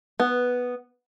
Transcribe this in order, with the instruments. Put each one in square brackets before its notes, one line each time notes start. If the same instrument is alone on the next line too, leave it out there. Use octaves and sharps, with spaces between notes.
[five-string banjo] B3